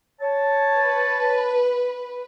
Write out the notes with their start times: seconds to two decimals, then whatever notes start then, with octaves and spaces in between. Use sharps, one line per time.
0.21 C#5 A5
0.79 B4